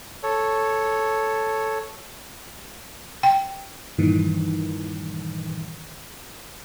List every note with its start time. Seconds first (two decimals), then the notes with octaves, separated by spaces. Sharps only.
0.23 A4 C#5
3.23 G5
3.98 G2 A#2 D#3 E3